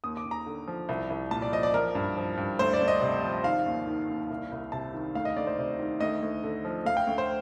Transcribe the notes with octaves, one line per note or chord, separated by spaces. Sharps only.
D#2 D#6
D6
D#2
A#5
D3
F3
C2
C2
A#2 A5
D5
F3 D#5
D5
F3 A#4
G2
F3
G2
D2 C5
D5
D2
D#5
C3
F3
D#3 F5
D#2
D#3
D#2
C2
C2
C3 A5
D#3
D2 F5
D#5
D2 D5
C5
C3
D#3
D2 D#5
D2
D3
F3
D2 F5
G5
D2
C5